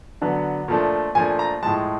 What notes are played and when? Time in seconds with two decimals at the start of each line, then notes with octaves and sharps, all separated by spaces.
0.22 D3 F#3 B3 D4
0.68 A#2 F3 A3 D4
1.15 A#2 F3 A3 D4 G#5
1.39 A#5
1.63 A2 F3 G#3 A5